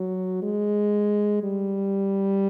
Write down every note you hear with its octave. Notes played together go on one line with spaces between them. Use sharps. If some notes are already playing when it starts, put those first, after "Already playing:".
Already playing: F#3
G#3
G3